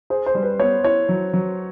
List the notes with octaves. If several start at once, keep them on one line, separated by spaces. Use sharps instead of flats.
G#4 C5
C5
G3
B4
B3 C#5
E4 C#5
F#3
F#3